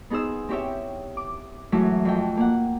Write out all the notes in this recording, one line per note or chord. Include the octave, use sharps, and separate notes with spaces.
B3 D#4 G#4 C5 E6
C4 E4 G4 C#5 E5 G5
D6
F#2 E3 F#3 G#3 A3 E4
F2 G5
A#3 F#5